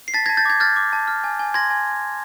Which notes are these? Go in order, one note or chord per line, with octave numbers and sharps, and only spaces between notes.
C7
A5 A6 B6
A5 G#6 A#6
G6 A6
D6 G#6
F6 G6 A6
D6
A5
F6
G#5
G#5
C6 G#6 A#6
G#5